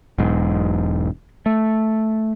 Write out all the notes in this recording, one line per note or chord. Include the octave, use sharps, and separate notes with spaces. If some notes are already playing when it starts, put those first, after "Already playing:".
E1 B1 G#2
A3